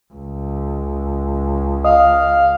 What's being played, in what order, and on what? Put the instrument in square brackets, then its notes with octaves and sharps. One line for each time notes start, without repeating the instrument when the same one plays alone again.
[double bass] C#2
[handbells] D#5 D#6 [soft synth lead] F5